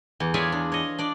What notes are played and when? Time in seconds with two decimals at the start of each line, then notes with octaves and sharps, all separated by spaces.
0.20 E2
0.34 F4 G#4 C#5 D5 E5 G#5
0.52 D4
0.72 C#5 D#5
0.98 D4 D5